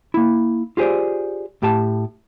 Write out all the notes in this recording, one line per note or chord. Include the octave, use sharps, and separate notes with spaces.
A#3 E4
F4 G4 G#4 C5 D5
A2 G4 A5